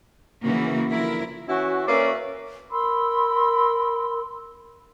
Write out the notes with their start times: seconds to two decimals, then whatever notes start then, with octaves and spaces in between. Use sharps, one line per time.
0.44 C#3 E3 A#3 F#4
0.90 D3 F3 E4 A#4
1.48 E3 C#4 E4 F#4
1.87 A#3 C#4 B4 C#5 D5 E5
2.71 A#4 B5 C6 E6